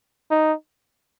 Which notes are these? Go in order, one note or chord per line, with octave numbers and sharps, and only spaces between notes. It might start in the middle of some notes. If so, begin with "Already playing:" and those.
D#4